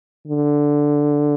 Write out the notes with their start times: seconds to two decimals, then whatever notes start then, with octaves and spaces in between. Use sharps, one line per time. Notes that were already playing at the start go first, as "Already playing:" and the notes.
0.27 D3